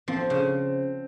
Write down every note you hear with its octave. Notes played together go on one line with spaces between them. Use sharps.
F3 C4
C#3